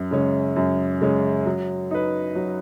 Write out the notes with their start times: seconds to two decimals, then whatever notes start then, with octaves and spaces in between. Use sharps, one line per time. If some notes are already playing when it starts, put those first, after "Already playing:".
Already playing: F#2
0.11 C#3 G#3 C#4
0.56 F#2
1.01 C#3 G#3 C#4
1.46 F#3
1.91 D#4 B4
2.35 F#3